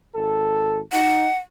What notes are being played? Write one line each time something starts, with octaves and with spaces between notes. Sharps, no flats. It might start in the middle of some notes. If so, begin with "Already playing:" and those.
G#1 A4
D#4 F#5